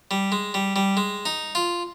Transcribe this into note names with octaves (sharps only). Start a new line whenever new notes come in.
G3
G#3
G3
G3
G#3
D#4
F4